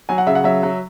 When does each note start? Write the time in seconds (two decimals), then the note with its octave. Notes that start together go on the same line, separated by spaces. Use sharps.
0.09 F#3 G#5
0.18 F#5
0.26 C#3 E5
0.35 F#5
0.44 F#3 E5
0.63 F#3